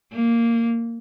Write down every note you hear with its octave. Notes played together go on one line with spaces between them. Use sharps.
A#3